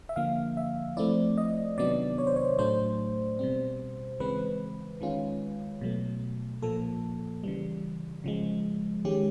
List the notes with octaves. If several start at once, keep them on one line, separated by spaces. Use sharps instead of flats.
E5
D3 F3 A#3 F5
E5
F3 A3 C4 E4 D5
D#5
C3 D#3 F#3 B3 D4 D5
C#5
C5
C#5
A2 F#3 A3 D4 C5
B2 G3 C4
C#3 E3 G#3 C4 B4
D#3 G#3 C#4 F4
B2 F#3 A3
A#2 F3 A#3 A4
C#3 E3 G3
C#3 F3 G#3
D#3 G#3 C#4 G4